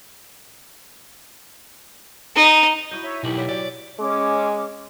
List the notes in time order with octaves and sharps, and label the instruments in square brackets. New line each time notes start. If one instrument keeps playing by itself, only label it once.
[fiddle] D#4
[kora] E4 F#4 D#5 [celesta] G6
[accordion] C#5 E5
[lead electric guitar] B1 [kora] D#3 E3 [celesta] E4 F#7 [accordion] G4
[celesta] C#5 [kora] D5 E5 F#5
[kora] E3 F#3 [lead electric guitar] D5
[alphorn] G#3 [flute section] C#4 D6